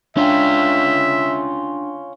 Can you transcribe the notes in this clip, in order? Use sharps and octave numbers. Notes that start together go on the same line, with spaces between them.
C#4 D4 F4 E5 G5